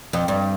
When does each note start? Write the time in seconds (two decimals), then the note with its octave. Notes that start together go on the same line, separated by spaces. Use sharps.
0.13 F2
0.28 G2